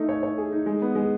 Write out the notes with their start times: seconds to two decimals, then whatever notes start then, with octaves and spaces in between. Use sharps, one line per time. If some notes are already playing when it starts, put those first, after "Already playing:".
Already playing: A3 D#4
0.09 C#5
0.23 C#5
0.38 G#4
0.52 D#4
0.66 G#3
0.82 B3
0.95 G#3